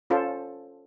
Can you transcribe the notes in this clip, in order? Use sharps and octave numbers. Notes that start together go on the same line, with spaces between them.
C#4 F4 A4 C5